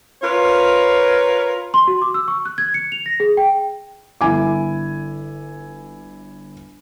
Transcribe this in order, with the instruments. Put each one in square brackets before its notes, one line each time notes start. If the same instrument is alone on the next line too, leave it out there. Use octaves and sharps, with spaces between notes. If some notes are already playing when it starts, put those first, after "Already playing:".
[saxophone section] F4 A#4 B4 C#5
[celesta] C6
F#4
D6
E6
C#6
F#6
G#6
C#7
F7
A#6
G#4
G5
[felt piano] G1 E4 G#5 D6